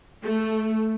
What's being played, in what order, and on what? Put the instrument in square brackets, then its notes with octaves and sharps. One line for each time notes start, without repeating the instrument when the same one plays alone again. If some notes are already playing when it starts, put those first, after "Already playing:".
[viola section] A3